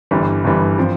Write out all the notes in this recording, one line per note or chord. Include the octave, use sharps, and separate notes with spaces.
G1 G2 E3 G3
G1 G2 E3 G3
F3 C4